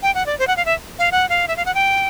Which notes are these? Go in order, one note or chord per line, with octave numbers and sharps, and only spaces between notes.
G5
F#5
D5
C5
F#5
F5
E5
F5
F#5
F5
E5
F5
F#5
G5